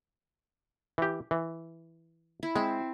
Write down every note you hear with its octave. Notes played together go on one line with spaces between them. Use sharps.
E3 G4
E3
E4
G#3 C4